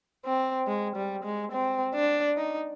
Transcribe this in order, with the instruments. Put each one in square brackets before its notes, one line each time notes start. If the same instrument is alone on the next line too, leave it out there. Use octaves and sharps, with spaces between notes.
[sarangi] C4
G#3
G3
G#3
C4
D4
D#4